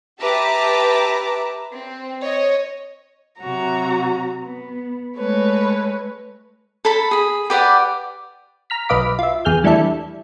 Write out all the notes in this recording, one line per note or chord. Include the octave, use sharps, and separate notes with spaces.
G4 B4 E5 A5 A#5 D6
C4
C#5 D#5
C3 F#3 F#4 A#5
B3
G#3 A3 B4 C#5
A4 A5 B5
G#4 B5
G4 B4 D5 F#5
A#5 F6 B6
B1 B4 D#5 F5 D6 B6
F4 E5
E2 G#4 F6 G6
E3 G3 A3 D4 E4 A4